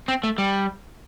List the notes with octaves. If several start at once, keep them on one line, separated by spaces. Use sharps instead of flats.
C4
A3
G3